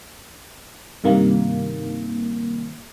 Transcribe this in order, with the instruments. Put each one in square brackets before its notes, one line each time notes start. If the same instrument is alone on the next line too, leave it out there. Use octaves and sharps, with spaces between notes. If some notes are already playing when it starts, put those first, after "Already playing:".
[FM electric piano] G2 C3 D#3 A#3